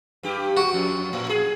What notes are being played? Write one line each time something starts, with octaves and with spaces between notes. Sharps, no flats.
G2 G4
F#4
F2
A2
G#4